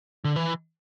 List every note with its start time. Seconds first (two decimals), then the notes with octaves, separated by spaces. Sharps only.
0.24 D3
0.36 E3